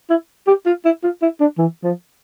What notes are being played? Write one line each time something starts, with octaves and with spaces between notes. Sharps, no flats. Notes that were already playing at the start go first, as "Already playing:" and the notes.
E4
G4
F4
E4
F4
E4
D4
E3
F3